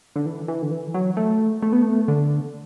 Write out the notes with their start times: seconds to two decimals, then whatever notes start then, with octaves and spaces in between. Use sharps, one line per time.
0.16 D3
0.26 E3
0.48 E3
0.62 D3
0.71 E3
0.94 F#3
1.17 A3
1.62 A3
1.73 B3
1.82 A3
2.08 D3